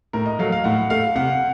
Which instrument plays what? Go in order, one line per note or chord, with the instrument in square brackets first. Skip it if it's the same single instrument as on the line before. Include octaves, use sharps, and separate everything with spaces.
[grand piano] A2 A#4
D#5
F#3 A3 F5
F5
A2 F#5
A3 F5
C3 F#5